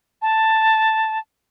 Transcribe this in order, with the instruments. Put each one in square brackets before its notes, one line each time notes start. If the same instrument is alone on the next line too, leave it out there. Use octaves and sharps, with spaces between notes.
[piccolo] A5